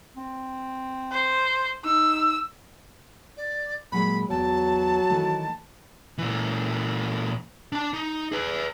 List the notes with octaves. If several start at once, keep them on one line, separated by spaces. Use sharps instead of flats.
C4
C5
D#4 E6
D5
A#2 F#3 G#3 B5
E2 F#3 B3 G5 A5
D#3 E3 A3
A#2 E3
D4 A5
D#4
G#4 B4